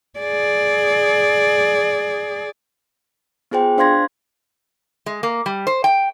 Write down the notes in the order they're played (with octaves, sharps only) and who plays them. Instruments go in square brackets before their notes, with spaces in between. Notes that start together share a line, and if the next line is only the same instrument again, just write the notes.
[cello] G#4 D5
[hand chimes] B3 F4 G#4 C5 G5
D4 C5 F5 C6 G#6 A#6
[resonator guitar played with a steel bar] G#3
A#3
G3
C5
G5